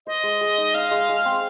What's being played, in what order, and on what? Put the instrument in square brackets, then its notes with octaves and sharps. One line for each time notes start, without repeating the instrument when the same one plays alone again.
[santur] C5 [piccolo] D#5
[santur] G#3
G#3
D#4
[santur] D#4 [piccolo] F5
[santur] G#3
G#3
C4